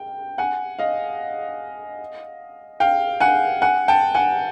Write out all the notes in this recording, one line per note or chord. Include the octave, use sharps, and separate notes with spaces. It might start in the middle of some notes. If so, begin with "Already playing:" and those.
Already playing: G5
F#5 G#5
D#5 F5
F5 G5
F#5 G#5
F#5 G#5
G5 A5
F#5 G#5